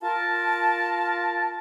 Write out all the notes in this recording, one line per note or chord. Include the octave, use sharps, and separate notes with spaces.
F4 A#4 A5